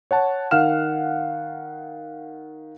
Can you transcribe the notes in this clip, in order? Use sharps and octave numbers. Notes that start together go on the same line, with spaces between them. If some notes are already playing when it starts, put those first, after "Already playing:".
C#5 F#5 A5
D#3 F5 F#5 F6 E7